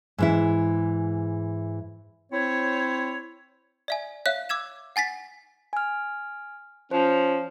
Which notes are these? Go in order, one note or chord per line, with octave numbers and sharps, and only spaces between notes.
G#2 E3 E4
C4 E4 C5 C#5
D5 E5 G#5
C#5 E5 F5 F#6
D6 E6 G#6 E7
F#5 G#5 A6 B6
G#5 F6
F3 C#4 C5